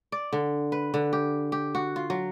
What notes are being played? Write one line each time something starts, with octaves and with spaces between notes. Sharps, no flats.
D5
D3
B4
D3
G4
G4
F#4
F4
F#3